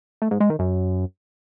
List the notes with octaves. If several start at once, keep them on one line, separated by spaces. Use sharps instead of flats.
A3
G#2
G#3
D#3
F#2